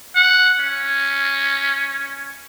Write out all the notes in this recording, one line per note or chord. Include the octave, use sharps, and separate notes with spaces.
F#5
C#4